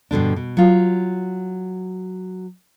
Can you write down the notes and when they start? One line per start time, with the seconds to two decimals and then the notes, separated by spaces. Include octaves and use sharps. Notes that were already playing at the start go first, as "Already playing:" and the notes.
0.11 G2 B2 D3 D4
0.36 B2
0.57 F#3 F4